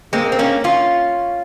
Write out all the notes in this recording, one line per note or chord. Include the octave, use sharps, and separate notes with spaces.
G#3 A#3 C4
C4
A#3 C#4
C#4 F4